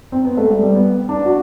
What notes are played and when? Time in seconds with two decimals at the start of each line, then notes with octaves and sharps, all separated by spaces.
0.12 C4
0.25 B3
0.37 A3
0.50 G3
0.63 G3
0.75 B3
1.09 D4
1.25 F#4